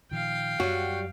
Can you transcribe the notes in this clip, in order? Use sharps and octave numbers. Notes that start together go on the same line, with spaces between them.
A#2 D#3 F3 F5 G5
F#2 F#3 G3 F#4